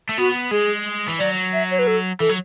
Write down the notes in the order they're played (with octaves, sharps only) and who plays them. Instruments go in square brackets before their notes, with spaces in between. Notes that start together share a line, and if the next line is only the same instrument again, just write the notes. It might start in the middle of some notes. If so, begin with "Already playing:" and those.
[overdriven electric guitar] A3
[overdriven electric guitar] B3 [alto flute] F#4
[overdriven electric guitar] G#3 [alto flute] G#4
[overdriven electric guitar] E3
[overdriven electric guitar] F#3 [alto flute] D5
[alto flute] E5
C#5
B4
A4
[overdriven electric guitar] E3 [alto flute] A4
[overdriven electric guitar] F#3